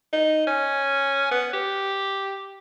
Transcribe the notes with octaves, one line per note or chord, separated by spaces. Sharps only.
D#4
C#4
B3
G4